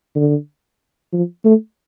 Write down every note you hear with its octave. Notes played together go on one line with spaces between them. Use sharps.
D3
F3
A3